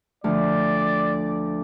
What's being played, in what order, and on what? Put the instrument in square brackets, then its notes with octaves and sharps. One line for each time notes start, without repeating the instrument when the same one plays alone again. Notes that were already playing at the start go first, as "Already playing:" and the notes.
[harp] D2 F3 [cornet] D5